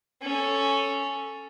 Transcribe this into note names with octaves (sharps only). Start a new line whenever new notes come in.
C#4 A4